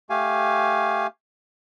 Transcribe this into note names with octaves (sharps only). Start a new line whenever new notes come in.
A3 G4 F5 G#5